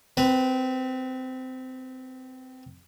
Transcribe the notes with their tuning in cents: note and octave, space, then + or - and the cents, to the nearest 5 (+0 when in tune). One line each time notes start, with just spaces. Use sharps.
C4 -20 B4 +0